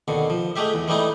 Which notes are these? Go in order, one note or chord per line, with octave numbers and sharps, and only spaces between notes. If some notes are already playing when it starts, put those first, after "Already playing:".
D#2 B2 D3
F3
G#3 A3 G4 E5
E2
E3 G3 A3 D#4 E4